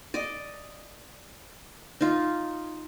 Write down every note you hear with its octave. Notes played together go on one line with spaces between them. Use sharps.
D5 D#5
D#4 F4